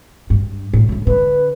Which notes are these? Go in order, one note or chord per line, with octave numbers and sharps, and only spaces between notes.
G2
A2
A2 D3
D3 B4